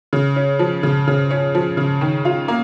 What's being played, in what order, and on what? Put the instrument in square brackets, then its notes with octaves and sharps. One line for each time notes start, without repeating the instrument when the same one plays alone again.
[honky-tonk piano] C#3
C#4
F3
C#3
C#3
C#4
F3
C#3
D#3
F4
A#3